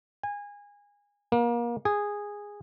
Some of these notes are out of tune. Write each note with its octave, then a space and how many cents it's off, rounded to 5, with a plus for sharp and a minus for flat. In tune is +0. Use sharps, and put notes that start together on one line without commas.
G#5 -25
A#3 +30
G#4 -10